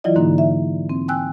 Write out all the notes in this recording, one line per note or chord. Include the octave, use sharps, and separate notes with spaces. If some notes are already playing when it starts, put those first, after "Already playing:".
E3 F#3 E4 F4 D5 D#5
G#2 D3 A#3 D#4
E5
C4
G5 G#5 E6 F#6